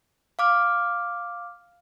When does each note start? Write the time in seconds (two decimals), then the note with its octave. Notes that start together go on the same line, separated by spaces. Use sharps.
0.39 F5 D6 F6